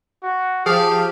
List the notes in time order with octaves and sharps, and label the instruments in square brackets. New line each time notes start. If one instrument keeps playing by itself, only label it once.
[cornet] F#4
[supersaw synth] F3 G4 [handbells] G#4 [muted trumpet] F5 [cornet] A5